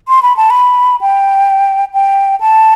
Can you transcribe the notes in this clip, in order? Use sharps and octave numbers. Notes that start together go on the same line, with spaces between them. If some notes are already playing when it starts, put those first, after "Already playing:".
C6
B5
A5
B5
G5
G5
A5